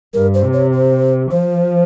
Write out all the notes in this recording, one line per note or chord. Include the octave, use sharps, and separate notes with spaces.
G2 A#4
C5
C3
C#5
C5
F3 C5